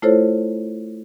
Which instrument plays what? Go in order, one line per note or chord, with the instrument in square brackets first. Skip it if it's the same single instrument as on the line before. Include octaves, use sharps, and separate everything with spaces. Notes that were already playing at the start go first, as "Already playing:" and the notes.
[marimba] A3 E4 F4 A4 C5 C#5